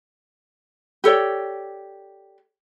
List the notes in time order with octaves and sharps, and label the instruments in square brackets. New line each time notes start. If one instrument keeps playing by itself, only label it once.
[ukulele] G4 A4 C#5 D5